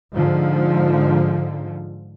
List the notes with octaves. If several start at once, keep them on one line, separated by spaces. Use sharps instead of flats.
G#2 D3 F3